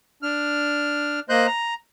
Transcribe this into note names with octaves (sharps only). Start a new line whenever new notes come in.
D4 F6
A#3 C5 D#5 C6 F#6 G6
A#5